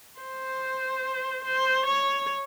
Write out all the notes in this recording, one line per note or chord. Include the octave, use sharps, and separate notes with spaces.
C5
C5
C#5